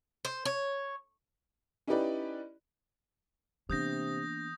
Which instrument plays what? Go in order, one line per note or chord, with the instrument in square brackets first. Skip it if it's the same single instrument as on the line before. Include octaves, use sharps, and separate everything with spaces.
[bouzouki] C5
C#5
[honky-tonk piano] C#4 D#4 E4 G4 B4 D5
[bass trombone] C3 [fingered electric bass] E3 B3 [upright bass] A#3 D4 [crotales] D#6 G6 A#6